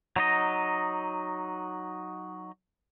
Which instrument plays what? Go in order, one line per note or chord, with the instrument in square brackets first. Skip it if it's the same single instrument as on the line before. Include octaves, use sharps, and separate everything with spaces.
[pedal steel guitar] F#3 D#4 D#5